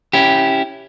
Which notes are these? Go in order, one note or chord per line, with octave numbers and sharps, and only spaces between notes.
C#4 E4 G4